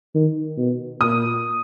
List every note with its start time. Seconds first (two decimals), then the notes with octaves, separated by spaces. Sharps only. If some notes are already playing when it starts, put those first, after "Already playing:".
0.15 D#3
0.57 B2
1.00 A#2 D#6